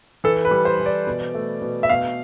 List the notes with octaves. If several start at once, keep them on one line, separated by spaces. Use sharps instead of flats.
E3 A4
B4
G3
C5
E3
D5
B2
A3
B2
E5
B2 F5